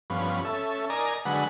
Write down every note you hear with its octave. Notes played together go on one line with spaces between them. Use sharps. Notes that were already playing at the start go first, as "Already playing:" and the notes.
G2 F3 B3 C#4
C#4 A4 E5
A#4 D5 D#5 G#5 A#5
D3 F#3 G#3 B4 F#5